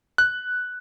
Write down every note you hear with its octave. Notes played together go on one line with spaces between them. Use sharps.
F#6